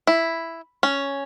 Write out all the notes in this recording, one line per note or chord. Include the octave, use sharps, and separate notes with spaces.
E4
C#4